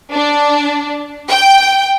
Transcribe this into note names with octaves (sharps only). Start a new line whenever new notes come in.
D4
G5